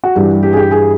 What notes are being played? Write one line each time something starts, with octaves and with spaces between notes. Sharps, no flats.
F#4
G2 E3 G3 G4
G4
G#4
G4
G#4